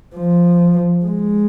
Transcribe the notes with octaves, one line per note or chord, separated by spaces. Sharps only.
F3
G#3